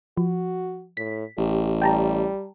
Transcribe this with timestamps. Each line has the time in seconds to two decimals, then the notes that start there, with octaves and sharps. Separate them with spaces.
0.17 F3 F#4
0.97 A2 B6
1.38 A1 G4
1.82 G3 G5 A5 A#5